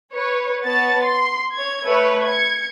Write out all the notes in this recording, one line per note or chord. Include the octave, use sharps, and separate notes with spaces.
B4 C#5
B3 C#5 A5 A6
C6
C#5 G#6
A3 B4 C#5
G#6 C#7